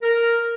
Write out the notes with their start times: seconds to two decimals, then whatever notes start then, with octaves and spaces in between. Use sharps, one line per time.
0.03 A#4